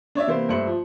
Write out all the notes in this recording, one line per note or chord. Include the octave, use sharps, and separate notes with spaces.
D4 C#5 D5 E5
C3 E3 A#3 C5
G2 A3 C5 E5 C#7 F#7
F3